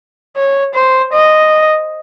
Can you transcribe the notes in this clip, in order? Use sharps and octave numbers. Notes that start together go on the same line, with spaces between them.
C#5
C5
D#5